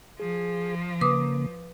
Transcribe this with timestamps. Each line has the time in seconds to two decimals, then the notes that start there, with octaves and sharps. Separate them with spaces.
0.19 F3 G#4
1.01 C#3 A#3 B4 D6 D#6